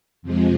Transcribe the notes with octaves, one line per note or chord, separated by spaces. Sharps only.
F2 C3 F3 G#3